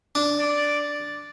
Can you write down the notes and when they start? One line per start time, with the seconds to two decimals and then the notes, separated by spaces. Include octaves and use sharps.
0.15 D4
0.38 D5